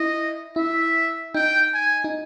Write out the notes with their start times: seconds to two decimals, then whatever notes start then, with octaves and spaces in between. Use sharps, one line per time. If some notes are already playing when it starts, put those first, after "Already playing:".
Already playing: E4 D#5
0.56 E4 E5
1.35 D#4 G5
1.74 G#5
2.04 D#4